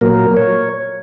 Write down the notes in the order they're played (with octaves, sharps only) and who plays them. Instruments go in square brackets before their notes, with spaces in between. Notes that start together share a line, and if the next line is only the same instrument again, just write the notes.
[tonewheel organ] A#2 F#3 A#3 A#4
C#5